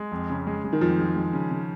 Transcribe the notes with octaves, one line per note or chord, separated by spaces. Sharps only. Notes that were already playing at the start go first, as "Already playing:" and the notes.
Already playing: G#3
F2
C#3
G#3
G#3
D#3
F2 F3
G#3
G#3
C#3
C#3